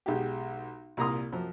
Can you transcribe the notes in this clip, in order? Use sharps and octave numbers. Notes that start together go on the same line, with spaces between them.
B1 G#3 G4
C2 A#2 A#3 A#5 C6 D#6
F#2 F3